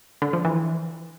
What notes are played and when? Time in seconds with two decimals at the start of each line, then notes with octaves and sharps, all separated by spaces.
0.22 D3
0.33 F3
0.45 E3